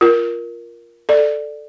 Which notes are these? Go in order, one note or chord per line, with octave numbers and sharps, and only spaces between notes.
F4 A#4
A4 D5